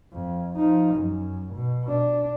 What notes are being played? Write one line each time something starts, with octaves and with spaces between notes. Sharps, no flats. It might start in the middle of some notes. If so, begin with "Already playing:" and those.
F2
F3 D#4
F#2
B2
D4